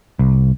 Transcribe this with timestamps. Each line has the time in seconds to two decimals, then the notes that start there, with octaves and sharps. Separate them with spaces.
0.19 C2